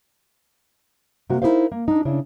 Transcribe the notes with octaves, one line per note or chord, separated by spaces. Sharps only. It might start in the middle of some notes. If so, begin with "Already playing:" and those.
C3 A#3 F#4
D#4 E4 G#4 A#4 C5 F5
A#3
D4 D#4
C#3 D4 E4